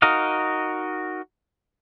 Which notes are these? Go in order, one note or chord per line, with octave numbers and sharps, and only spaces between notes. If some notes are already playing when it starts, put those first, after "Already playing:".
D#4 F#4 A#4 D#5 F5